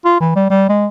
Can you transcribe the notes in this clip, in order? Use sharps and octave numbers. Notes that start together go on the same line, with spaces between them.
F4
E3
G3
G3
G#3